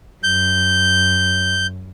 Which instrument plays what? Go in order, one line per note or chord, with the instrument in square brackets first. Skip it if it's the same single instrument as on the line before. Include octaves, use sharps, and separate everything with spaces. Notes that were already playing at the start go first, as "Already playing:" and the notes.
[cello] F#2 [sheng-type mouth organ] G6